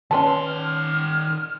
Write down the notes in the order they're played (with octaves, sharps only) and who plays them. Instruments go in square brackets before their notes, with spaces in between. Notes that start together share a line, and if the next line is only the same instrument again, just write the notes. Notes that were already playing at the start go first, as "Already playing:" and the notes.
[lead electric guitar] D#3 C6 [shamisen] C#4 B4 A5
[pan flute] F6